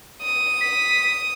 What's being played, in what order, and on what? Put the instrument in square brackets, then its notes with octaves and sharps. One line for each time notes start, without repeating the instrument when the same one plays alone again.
[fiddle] D#6
[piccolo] B6